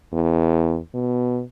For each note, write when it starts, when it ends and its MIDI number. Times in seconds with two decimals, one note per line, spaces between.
0.13 0.78 40
0.95 1.42 47